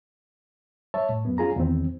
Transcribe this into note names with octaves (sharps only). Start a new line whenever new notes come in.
C#5 E5 A5
A2
F#2 B3
C#4 F4 G#4 A#5
E2 D#3 C4